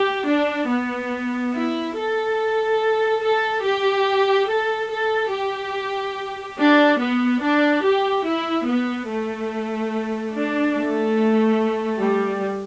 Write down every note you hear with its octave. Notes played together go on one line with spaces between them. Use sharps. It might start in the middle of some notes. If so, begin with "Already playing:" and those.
Already playing: G4
D4
B3
E4
A4
A4
G4
A4
A4
G4
D4
B3
D4
G4
E4
B3
A3
D4
A3
G3